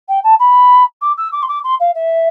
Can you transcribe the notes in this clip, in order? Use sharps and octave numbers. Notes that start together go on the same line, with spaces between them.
G5
A5
B5
D6
E6
D6
C6
D6
C6
F5
E5